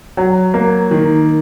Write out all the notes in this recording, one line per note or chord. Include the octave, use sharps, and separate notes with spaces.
F#3
A#3
D#3